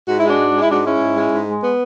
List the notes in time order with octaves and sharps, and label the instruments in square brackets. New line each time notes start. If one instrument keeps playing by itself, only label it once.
[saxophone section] G#2 F#4
E4
G#3 D4 F#4
G#2
G#3
E4
G#2 D4 F#4
G#3 C#4 E4
G#2
G#3
G#2
G#3
B3